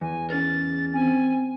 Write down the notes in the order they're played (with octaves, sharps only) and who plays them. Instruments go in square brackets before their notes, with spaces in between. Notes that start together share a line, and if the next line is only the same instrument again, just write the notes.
[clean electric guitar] E2 [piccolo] G#5
[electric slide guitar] C#4 G#4 A#4 [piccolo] A6
[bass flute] C4 [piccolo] G#5